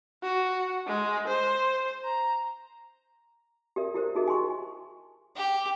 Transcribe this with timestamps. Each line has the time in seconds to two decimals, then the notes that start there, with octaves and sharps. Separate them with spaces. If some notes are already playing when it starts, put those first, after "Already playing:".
0.23 F#4
0.87 G#3
1.27 C5
2.05 A#5
3.76 G4 A4 A#4 D5 E5
3.94 E4 G4 A#4 C5
4.15 D#4 F#4 G#4 A#4 D#5 E5
4.28 G#5 A5 C6 C#6
5.36 G4